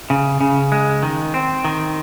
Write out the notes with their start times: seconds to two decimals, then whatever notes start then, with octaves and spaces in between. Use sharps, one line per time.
0.10 C#3
0.41 C#3
0.72 G#3
1.03 D#3
1.34 C4
1.65 D#3